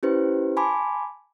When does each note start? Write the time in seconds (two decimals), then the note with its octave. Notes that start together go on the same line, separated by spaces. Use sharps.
0.03 C#4 E4 G4 B4 C5
0.57 G#5 A5 B5 C6 D6